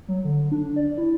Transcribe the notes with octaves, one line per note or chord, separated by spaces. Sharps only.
F#3
D3
D4
D5
E4